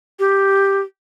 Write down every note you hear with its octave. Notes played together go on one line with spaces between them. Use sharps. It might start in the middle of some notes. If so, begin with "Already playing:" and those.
G4